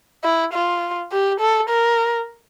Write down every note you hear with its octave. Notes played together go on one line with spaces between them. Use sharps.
E4
F4
G4
A4
A#4